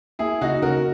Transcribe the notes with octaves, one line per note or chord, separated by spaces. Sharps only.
A#3 E4 G#4
C#3 D#4 F#4
C#3 F#4 A#4